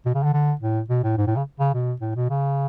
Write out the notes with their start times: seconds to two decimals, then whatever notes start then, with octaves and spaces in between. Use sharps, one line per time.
0.05 B2
0.15 C#3
0.23 D3
0.33 D3
0.61 A2
0.90 B2
1.04 A2
1.18 G#2
1.27 A2
1.36 C#3
1.59 C#3
1.74 B2
2.01 A2
2.16 B2
2.30 C#3